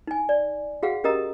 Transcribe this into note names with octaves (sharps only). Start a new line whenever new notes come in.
D#4 G#5
D5
F#4 G#4 F5 F#5
C#4 G4 A#4 D#5 A#5 D#6